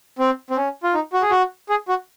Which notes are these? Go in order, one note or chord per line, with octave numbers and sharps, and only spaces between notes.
C4
C4
C#4
F4
D#4
F#4
G#4
F#4
G#4
F#4